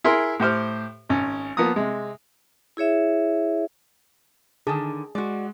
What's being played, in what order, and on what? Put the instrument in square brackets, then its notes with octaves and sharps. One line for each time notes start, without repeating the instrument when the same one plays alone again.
[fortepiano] E4 G#4 A#4 C6
A2 G4 C5 F6
G#1 C#4
F3 A#3 B3 A#5 D#6
C3 G#3
[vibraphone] E4 G#4 C#5 E5
[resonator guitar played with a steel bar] D3 D#3 [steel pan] G#4 A5
[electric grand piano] G#3 [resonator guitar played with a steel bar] F#4 D5